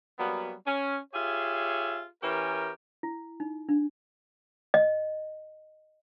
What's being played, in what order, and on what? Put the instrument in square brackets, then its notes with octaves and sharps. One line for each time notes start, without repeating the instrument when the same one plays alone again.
[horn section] F#3 G3 A#3 B3
C#4
F4 G4 G#4 C#5 E5
E3 C#4 G4 A#4
[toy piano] E4
D#4
D4
D#5